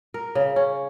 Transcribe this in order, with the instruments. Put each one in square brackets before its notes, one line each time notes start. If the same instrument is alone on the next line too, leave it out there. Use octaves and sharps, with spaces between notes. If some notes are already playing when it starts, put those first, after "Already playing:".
[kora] A#4
C#3
C#4